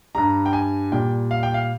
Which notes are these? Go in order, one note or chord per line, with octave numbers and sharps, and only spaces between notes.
G2 G3 A#5
G5
G#5
A#2 G3 G5
F5
G5
F5